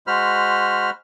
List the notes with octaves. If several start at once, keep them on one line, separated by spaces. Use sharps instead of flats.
G#3 F#4 C5 B5 F6